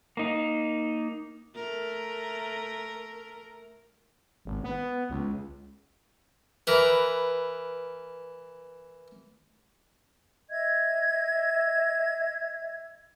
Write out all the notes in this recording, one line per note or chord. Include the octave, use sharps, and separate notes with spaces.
A#3 D#4
A3 A#4
G#1
B3
C#2
E3 A#4 B4
D#5 E5 G#6